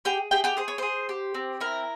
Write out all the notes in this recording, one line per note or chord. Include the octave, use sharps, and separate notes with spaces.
G4 G#4 G5
G4 G#4 G5
G4 G5
G#4 C5
C#5
G#4 C5
G4
C4
E4 A#4